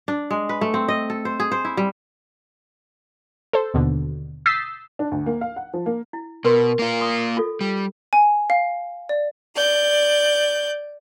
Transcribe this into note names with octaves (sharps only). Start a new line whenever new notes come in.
D4
G#3
B4
A3
C4
D#5
A4
C5
G#4
C5
E4
G3
A4 C5
D#2 B2 D3
D#6 E6 G6 A6 B6 C7
D4
D2
A#3
F5
F#5
F3
A#3
E4
B2 A#4 B4 C6
A#3 F4
C6 C#6 D#6
F4 A4
G3
G#5
F5
D5
D5 G6